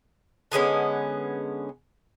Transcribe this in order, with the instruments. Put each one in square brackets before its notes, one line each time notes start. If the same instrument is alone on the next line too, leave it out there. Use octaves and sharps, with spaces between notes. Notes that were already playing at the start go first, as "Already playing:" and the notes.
[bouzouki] D3 G#3 B3 C#4